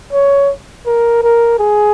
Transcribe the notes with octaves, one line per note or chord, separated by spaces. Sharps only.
C#5
A#4
A#4
G#4